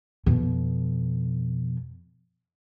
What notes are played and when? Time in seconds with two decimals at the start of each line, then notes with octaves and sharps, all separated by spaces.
0.26 F2 B2